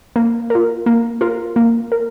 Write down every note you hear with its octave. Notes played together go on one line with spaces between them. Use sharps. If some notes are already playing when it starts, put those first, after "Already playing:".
A#3
F4 A#4
A#3
F4 A#4
A#3
A#4